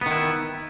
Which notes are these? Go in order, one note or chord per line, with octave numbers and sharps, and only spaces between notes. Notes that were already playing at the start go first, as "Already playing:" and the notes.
D#3 B3 E4